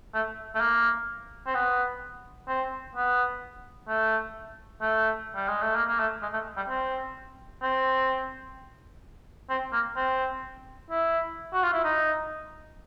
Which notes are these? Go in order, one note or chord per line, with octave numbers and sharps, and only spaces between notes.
A3
A3
A#3
C4
B3
C4
B3
A3
A3
G3
G#3
A3
A#3
A#3
A3
G#3
A3
G3
C4
C4
C4
A#3
C4
E4
F#4
F4
E4
D#4